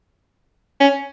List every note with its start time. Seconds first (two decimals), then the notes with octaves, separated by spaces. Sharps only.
0.80 C#4